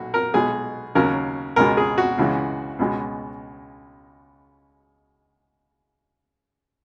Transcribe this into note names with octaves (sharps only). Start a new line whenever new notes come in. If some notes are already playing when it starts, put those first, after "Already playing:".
Already playing: B1 A#2 F#4
A#4
B1 B2 G#3 G#4
D#2 C#3 F#3 A#4
C#2 B2 G#3 A#4
G#4
F#4
C#2 C#3 E3 G#3
C#2 B2 G#3